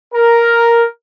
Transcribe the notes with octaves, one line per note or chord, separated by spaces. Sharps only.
A#4